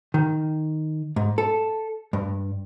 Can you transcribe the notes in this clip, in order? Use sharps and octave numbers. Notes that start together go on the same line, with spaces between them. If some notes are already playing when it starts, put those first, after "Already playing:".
D#3
G#2
A4
G2